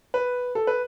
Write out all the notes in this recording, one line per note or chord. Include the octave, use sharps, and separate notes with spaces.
B4
A4
B4